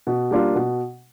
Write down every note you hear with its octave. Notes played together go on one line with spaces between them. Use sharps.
B2
G3 A#3 D4 F4
B2